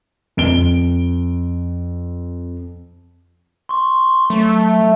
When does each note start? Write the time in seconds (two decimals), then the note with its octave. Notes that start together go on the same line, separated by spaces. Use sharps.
0.37 F2 D7 G7
3.69 C6 C#6
4.30 F#3 A3